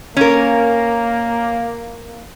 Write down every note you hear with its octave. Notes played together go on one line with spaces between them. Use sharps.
A#3 C#4 A#4